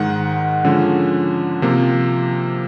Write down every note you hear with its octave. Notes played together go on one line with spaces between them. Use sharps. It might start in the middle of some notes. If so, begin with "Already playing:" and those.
Already playing: G#2 D#3 G#3 F#5
D3 F3 G#3 C#4
C3 F3 A#3